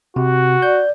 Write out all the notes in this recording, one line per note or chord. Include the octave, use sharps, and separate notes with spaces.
C3 F#4
D5 G6